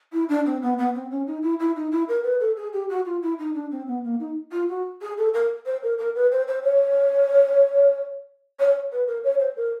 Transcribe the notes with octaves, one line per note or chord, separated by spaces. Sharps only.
E4
D4
C4
B3
B3
C4
C#4
D#4
E4
E4
D#4
E4
A#4
B4
A4
G#4
G4
F#4
F4
E4
D#4
D4
C4
B3
A#3
D#4
F4
F#4
G#4
A4
A#4
C5
A#4
A#4
B4
C5
C5
C#5
C#5
B4
A#4
C#5
C5
A#4